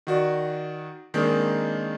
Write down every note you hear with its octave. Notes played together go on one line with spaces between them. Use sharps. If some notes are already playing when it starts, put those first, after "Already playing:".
D#3 F#4 D5
D#3 G#3 A#3 C4 D4